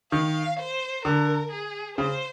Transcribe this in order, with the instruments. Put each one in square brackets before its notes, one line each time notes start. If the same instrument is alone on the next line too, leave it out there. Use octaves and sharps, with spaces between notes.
[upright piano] D#3 [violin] F5
[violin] C5
[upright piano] D3 [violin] A#4
[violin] G#4
[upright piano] C#3 [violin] C5